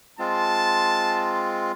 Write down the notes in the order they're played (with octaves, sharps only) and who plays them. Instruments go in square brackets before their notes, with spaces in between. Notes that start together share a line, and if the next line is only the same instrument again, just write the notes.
[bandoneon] G#3 C4 F4 [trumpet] A5